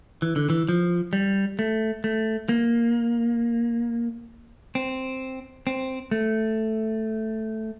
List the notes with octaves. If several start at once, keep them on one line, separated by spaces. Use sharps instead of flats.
E3
D3
E3
F3
G3
A3
A3
A#3
C4
C4
A3